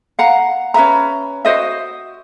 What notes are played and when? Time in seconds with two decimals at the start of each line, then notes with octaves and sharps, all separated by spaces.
0.19 F5 F#5 A#5
0.74 C#4 B4 E5 A#5
1.45 F#4 C5 D#5 E5